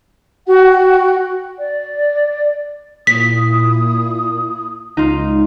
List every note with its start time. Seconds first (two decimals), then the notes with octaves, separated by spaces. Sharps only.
0.47 F#4 F#5 G5
1.58 D5
3.07 A#2 E4 D#6 B6
4.97 C#2 D#4 F4